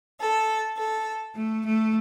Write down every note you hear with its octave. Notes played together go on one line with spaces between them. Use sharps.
A4
A4
A3
A3